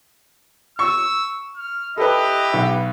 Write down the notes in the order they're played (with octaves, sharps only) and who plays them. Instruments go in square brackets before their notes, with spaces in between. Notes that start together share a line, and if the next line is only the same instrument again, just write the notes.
[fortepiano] C#6 [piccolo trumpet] E6
[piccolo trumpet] F6
[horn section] E4 G4 [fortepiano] A4 B4 [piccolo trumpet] D#5
[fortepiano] B1 [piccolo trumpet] B4